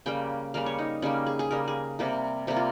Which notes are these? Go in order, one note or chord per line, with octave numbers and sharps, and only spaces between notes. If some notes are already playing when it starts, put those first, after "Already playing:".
C#3 G3 A#3 G5
C#3 G3 A#3 F5
C#5
D#4
C#3 G3 A#3 C#4
G#4
G#4
C#3 G3 A#3 A#4
G#4
C3 G3 A#3 G4
C3 G3 A#3 G4
F4